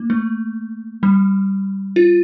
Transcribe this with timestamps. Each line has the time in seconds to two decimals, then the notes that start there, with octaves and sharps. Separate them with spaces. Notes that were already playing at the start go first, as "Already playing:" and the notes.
Already playing: A#3
0.10 A3
1.03 G3
1.96 F4